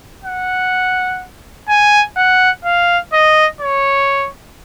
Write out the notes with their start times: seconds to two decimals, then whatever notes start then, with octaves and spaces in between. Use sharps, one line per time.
0.24 F#5
1.69 G#5
2.17 F#5
2.64 F5
3.13 D#5
3.61 C#5